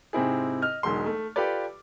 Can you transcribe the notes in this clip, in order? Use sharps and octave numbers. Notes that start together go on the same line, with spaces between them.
G#2 C3 C4 E4 G#4
D#5 F6
E1 B1 F#3 G#3 C6
A3
F4 G4 A4 B4 D5